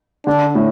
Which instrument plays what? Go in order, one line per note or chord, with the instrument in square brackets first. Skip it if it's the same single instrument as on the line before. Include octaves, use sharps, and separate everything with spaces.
[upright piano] D3 [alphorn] D4
[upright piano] A2